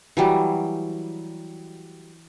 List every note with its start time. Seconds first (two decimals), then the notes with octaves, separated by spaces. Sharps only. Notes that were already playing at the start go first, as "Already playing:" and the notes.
0.17 E3 F#3 G3